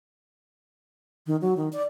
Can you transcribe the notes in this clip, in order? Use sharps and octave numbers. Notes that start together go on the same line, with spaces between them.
D#3
F#3
D#3
D5